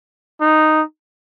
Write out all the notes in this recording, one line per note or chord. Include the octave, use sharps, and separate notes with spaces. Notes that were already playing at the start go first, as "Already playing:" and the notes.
D#4